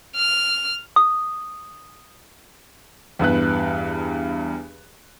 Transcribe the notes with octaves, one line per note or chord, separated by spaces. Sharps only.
F6
D#6
E2 G2 B4 F#6